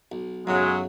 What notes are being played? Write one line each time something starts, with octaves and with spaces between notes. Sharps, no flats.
B1
B1 F#2 C#3 F#3 G#3